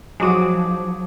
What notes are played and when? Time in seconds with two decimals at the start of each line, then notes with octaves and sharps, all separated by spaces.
0.20 F3 F#3 G#3 D#4 F#4 D6 D#6